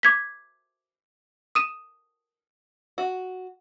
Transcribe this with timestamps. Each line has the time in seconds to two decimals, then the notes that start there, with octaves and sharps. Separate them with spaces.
0.03 D6 G#6 B6
1.55 D#6 D#7 E7
2.98 F#4